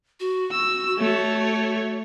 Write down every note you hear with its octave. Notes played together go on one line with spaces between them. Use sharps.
F#4
E6
A3 C#5